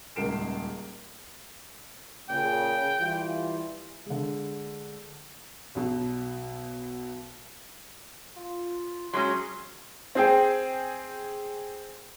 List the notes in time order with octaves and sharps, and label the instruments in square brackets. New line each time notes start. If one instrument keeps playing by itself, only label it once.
[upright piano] D#1 C#2 A#4 C7 D7 E7
[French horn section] A#2 C#3 [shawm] G5
[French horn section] E3 G3 F4
[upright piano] D3 G#3
[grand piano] B1 B2
[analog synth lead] F4
[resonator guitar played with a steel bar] F#3 G#3 C#4 [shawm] C6 [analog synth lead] G#6
[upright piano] C4 G#4 G5